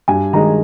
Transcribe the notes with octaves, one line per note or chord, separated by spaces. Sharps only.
G2 G#5
D#3 G#3 A#5